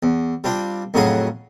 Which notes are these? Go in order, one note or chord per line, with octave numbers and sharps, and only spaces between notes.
E2
G3 C4 D4 F4
F2 A2 C#3 F#3 G#4 D#5